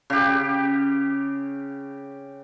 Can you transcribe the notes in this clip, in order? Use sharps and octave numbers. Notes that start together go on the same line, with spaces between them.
C#3 G4